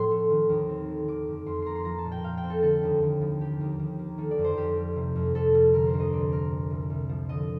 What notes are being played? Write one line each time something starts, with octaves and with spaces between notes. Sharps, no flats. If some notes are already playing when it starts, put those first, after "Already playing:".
Already playing: A2 F3 C4 C6
A3
D#3
D#2
C4
A3
D#3 D6
F2
F2 C6
A#3 A#5 C6
C6
F3 A#5
A5
A#2
G5
A#2 F5
G5
C4
A4
D3 A4
D#2
D#2
F3
D#3 G4
D#2
D#2
A#3
D#3 A4
D5
F2
C5
F2 G4
G3
C3
F2
F2 A4
G3
D3 A#4
C5
D2
D#5
C4 D5
A3 A#4
A#2
C2
C2
F3
D3 D#5